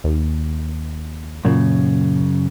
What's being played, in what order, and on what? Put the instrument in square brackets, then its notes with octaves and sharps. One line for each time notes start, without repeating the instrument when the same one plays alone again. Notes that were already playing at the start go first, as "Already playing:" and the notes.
[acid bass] D#2
[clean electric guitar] F#2 C#3 [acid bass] A#2